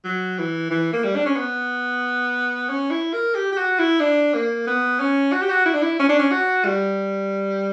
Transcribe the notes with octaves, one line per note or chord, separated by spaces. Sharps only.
F#3
E3
E3
A#3
G3
D4
C#4
B3
C#4
E4
A#4
G4
G4
F#4
E4
D4
A#3
B3
C#4
F#4
G4
F#4
E4
D4
E4
C#4
D4
C#4
F#4
G3